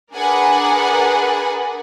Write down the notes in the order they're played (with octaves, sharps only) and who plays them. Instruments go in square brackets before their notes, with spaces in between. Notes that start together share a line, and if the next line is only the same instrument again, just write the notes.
[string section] D4 G#4 A#4 B4 F#5 G#5